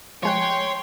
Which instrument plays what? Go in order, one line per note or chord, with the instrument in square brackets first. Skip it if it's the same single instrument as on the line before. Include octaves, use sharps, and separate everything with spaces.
[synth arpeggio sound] F3 G#3 F#6 [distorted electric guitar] C#5 [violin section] G5 [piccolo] C6